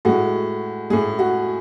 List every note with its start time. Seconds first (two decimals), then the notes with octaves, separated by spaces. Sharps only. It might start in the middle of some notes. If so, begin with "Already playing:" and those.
0.05 A2 G#3 F#4
0.90 A2 G#3 G#4
1.19 F#4